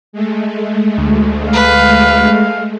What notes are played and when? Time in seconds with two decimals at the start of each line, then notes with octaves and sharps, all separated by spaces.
0.13 G#3 A3
0.98 D2
1.53 B4 F5